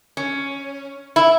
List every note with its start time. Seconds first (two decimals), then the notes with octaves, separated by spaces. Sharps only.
0.17 C#4
1.16 E4